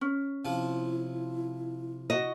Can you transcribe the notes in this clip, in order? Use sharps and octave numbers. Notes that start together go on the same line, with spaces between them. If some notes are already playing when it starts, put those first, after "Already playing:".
C#4
C3 F3 E4
F#4 D#5